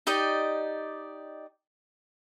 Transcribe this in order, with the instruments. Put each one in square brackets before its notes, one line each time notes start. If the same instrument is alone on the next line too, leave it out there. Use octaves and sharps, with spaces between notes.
[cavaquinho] D#4 G4 D5 D#5